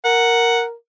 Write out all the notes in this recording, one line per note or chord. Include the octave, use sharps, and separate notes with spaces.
A#4 F#5